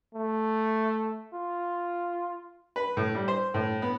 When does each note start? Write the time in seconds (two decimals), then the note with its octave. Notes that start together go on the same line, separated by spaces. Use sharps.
0.14 A3
1.34 F4
2.76 B4
2.97 A2
3.15 G3
3.28 C5
3.54 A2
3.82 B3